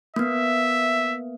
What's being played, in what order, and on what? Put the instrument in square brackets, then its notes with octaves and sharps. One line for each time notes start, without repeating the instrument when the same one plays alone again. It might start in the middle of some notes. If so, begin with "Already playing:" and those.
[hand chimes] A#3 B3 [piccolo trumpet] E5